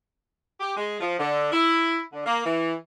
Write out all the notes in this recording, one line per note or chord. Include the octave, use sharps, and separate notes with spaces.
G4
G#3
F3
D3
E4
D3
A#3
E3